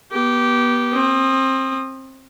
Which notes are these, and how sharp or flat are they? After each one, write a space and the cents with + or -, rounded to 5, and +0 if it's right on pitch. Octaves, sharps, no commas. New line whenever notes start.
B3 -30 G4 -15
C4 +25 D#6 -15